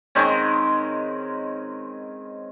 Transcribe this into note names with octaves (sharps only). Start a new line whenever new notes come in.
D#3 G#3 C4 C#4